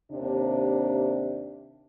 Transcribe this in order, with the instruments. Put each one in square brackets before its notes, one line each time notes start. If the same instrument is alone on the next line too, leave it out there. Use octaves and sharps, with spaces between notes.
[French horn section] D#2 C3 D4